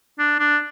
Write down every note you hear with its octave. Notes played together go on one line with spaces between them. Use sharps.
D4
D4